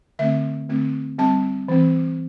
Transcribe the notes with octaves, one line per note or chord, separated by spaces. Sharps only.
D3 A3 C4 E5
D3 A3 C4
G3 C4 A5
E3 C4